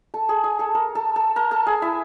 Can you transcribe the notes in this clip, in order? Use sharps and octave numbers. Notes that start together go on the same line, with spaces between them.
A4 A5
G#4 G#5
G#4 G#5
A4 A5
A#4 A#5
A4 A5
A4 A5
A#4 A#5
A4 A5
G#4 G#5
E4 E5